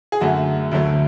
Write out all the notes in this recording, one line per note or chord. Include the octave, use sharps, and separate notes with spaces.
G#4
F#2 D3 A3 F#4
D2 D3 F#3 A3